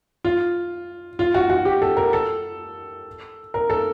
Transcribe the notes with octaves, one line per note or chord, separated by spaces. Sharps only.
F4
F4
F#4
F#4
G4
A4
A#4
A4
A#4
A4